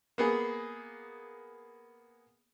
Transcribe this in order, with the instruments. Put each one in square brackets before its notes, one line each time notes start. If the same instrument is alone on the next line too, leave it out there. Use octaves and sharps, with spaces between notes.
[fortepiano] A#3 B3 G#4